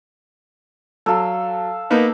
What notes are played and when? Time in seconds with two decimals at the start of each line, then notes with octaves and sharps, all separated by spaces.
1.06 F#3 A4 F5
1.90 A#3 B3 D#4